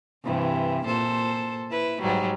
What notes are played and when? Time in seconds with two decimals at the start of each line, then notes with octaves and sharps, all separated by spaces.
0.24 G2 C3 E3
0.85 A#2 A4 C5
1.70 E4 B4
2.01 G#2 F#3 G3